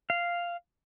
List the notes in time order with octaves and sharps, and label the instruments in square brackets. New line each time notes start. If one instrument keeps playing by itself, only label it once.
[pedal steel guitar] F5